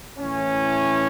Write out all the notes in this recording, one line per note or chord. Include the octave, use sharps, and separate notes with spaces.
A2 E3 C#4